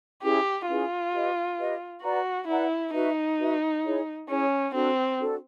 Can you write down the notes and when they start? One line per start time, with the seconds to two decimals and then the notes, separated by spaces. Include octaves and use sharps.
0.23 C#4 E4 G4 G#4 B4
0.67 C#4 E4 F4 G#4 B4
1.13 G4 B4 D#5
1.58 G4 B4 D#5
2.02 F#4 B4 D5 F#5 A#5
2.48 E4 B4 D5 F#5 A#5
2.93 D#4 F#4 B4 E5
3.39 F#4 B4 E5
3.83 E4 G#4 C#5
4.29 C#4 E4 G#4 C#5
4.73 C4 D4 F#4 A4
5.18 D4 F#4 A4